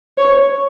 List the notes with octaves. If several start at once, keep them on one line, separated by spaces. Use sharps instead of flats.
C#5